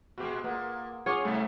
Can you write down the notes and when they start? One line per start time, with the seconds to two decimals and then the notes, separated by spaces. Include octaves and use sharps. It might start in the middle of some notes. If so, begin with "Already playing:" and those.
0.18 A#2 G#3 F#4 G4
0.44 A#2 A#3 B4 F#5 D#6
1.06 C#4 F4 G#4 C#5 F#5 D6 D#6
1.25 G#2 C3 G3 A3 A4